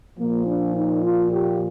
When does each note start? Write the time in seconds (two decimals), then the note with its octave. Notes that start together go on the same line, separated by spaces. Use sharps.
0.18 A#2 F3 A#3
0.45 D4
0.74 D#4
1.03 F4
1.31 G4